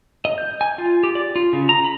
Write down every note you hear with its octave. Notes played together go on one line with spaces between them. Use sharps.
D#5
G6
G#5
F4
G4
D5
F4
C#3
A#5
B5